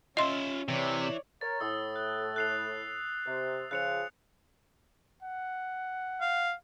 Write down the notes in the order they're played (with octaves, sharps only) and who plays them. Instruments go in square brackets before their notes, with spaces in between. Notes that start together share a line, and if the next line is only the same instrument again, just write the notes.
[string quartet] C#4 [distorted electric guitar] F4 E5 [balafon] D#5 C6
[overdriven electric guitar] C3 [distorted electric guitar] E3 [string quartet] C#5 D5
[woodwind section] A#4 C#5 [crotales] A6
[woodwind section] A2 [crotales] D#6 E6
[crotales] F#6
F#6 C7 F7
[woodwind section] C3
[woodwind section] C#3 F3 [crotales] F#6 C#7 F7
[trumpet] F#5
[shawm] F5